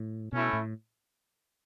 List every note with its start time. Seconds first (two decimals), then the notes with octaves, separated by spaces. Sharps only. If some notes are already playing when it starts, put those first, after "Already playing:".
Already playing: A2
0.33 B2 A3 C#4 E4
0.53 A2